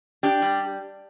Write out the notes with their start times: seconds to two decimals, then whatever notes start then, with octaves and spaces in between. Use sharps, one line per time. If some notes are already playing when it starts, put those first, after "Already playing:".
0.23 D4 G4
0.42 G3